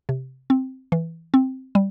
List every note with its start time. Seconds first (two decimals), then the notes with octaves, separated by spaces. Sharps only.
0.09 C3
0.50 C4
0.92 E3
1.34 C4
1.75 G3